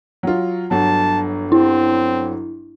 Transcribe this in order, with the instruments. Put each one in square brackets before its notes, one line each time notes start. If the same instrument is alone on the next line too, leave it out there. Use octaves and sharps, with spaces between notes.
[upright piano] F#3 F4
[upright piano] G1 F#3 [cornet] A5
[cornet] C4 [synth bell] E4